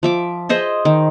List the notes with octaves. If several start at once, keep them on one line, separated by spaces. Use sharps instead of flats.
F3 E5 D6
G#4 C5 D#5 E5
D#3